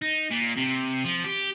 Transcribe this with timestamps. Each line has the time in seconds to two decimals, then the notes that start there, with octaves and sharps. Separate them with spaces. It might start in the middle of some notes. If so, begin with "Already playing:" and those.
0.02 D#4
0.31 A#2
0.57 C3
1.04 F3
1.24 G4